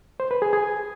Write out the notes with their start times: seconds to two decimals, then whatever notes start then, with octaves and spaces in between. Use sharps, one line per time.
0.20 C5
0.31 B4
0.42 G#4
0.53 G#4